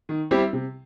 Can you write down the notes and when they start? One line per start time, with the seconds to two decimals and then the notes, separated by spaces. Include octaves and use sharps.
0.09 D#3
0.31 G3 C4 E4 G4
0.53 C3